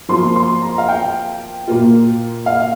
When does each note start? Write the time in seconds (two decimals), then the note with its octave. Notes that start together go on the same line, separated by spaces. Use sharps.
0.09 F3 A#3 F4 C6
0.36 C6
0.62 A#5
0.78 F5
0.88 G5
1.67 A#2 A#3 F4
2.46 F5